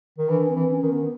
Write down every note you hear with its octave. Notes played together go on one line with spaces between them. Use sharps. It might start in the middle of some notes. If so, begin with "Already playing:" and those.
D#3
E3 D4
C4
E3
C#4
D#3
B3